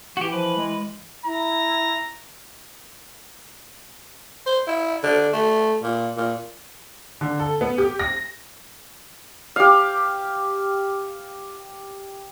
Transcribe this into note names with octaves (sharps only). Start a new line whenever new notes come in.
E3 F#4 G4
F3 B4
G#3
E4 A#5
C5
E4
D3
A3
A#2
A#2
D3
A4
B3
G4
A#6
G4 F5